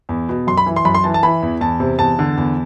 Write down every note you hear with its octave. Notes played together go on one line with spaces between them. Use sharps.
E2
B2
F#2 C6
B5
E3
C6
F#2 B5
C6
E3 A5
A5
E3 B5
E2
E2 A5
C3
E2 A5
D3
E2